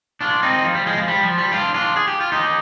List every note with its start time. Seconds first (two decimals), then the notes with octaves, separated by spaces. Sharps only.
0.21 D4 F4
0.43 C4 D#4
0.65 F3
0.75 G3
0.86 F3 G#3
0.97 F3
1.08 G3
1.23 F3
1.38 G3
1.52 D4 F4
1.74 D4 F4
1.96 G#4
2.07 G4
2.21 F4
2.32 D#4 G4